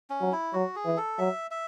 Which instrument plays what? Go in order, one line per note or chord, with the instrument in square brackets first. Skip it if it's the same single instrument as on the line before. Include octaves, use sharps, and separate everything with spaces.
[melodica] C#4
[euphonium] F#3
[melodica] E4
[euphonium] F#3 [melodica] F#4
[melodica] G#4
[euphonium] E3
[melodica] A4
[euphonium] F#3 [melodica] E5
[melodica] E5